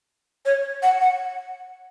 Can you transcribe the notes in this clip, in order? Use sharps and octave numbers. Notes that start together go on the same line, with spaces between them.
C#5
F#5
F#5